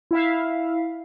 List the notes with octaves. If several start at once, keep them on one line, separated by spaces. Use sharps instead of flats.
E4 E5 F5